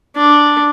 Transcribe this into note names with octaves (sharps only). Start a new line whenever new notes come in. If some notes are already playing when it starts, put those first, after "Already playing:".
D4